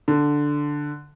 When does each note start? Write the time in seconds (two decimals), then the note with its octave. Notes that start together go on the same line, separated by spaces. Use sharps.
0.08 D3